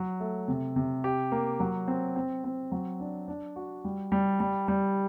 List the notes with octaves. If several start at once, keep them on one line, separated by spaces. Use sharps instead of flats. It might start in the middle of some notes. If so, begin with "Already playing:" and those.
Already playing: F#3
A3
C3
C3
G4
A#3
F#3
C4
C4
C4
F#3
D4
D4
F#4
G3
G3
G3
G3